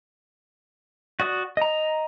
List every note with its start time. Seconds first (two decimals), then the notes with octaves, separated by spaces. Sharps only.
1.20 F#4 D5 D#6
1.57 D#5 A#5